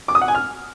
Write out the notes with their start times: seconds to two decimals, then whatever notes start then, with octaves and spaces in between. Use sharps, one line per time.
0.08 D6
0.15 D#6
0.22 F#5
0.28 G#5
0.35 F6